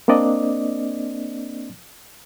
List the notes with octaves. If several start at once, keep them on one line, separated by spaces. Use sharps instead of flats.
A#3 C4 D4 D5 D#5